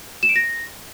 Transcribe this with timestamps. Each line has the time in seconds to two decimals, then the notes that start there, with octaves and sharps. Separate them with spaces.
0.23 E7
0.29 D7
0.36 A#6